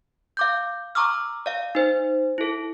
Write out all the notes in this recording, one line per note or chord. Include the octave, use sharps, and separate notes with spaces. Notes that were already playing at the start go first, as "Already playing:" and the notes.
F5 D6 G6
A#5 C#6 D6 E6 F6
D5 F5
D#4 C5
E4 A4